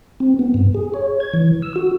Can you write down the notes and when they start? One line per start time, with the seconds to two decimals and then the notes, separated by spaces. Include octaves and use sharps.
0.20 C4
0.39 B3
0.54 G2
0.74 G#4
0.94 C#5
1.20 G#6
1.33 E3
1.62 E6
1.76 F#4